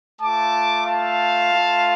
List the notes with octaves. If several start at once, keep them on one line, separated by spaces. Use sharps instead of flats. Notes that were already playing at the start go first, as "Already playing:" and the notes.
A3 F4 A5 D6
F5 A5
A3 F4